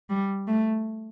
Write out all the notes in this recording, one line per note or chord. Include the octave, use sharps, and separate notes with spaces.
G3
A3